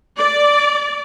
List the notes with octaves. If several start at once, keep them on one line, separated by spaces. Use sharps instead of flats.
D5